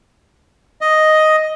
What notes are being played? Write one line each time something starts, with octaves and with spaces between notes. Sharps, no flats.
D#5